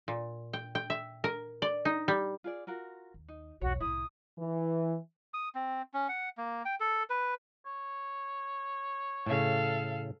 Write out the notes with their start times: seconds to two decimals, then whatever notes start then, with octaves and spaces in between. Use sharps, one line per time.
0.08 A#2
0.53 G5
0.75 G5
0.90 E5
1.24 A#4
1.62 D5
1.85 D#4
2.08 G3
2.44 F4 G#4 D5
2.67 F4 F#4 A#4
3.14 D#2
3.28 D#4
3.61 B1 E2 F#4 C#5
3.80 C2 A2 E4 D#6
4.38 E3
5.34 D#6
5.55 C4
5.94 C#4
6.09 F#5
6.38 A#3
6.65 G5
6.80 A4
7.10 B4
7.66 C#5
9.27 A2 C#3 A4 F5